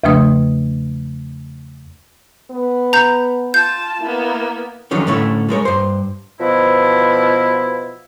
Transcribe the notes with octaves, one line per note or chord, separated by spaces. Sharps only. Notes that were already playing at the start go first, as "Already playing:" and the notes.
E2 C#3 F3 A3 D4 D#6
B3
A#5 G6
F4 A5 G6
A#3 B3 E4
D3 D#3 F3 F#3 C#4 D#4
A2 D3 A3 C#4 E4
G3 G#3 A#4 C#5
G2 C5
B2 F3 E4